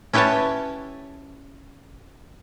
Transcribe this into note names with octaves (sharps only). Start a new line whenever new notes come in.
C#4 E4 G4 B4 C#5 A5